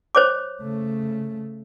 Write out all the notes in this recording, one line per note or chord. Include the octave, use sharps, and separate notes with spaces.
C5 C#5 D6
C#3 A3